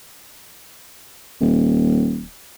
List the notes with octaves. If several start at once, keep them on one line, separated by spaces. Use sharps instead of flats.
D#1